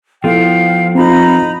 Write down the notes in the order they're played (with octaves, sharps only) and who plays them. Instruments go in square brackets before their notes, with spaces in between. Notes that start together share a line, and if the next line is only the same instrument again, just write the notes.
[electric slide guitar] F3 [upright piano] B3 E4 A4 [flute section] F5 G5
[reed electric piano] C4 F4 [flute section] D#4 A#5 B5